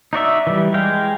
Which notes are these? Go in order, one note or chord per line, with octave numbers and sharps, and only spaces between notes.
D#4 F#4 D5 E5
E3 G3
G#3 F5 G5